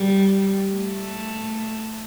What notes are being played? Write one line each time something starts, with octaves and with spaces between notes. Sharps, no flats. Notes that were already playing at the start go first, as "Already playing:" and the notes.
Already playing: G3
A3